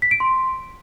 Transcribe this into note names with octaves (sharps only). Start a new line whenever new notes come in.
B6
D7
C6